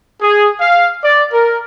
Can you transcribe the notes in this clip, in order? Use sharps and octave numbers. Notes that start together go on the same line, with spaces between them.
G#4
F5
D5
A#4